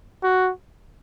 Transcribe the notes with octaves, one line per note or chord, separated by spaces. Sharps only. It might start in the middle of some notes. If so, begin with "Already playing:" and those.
F#4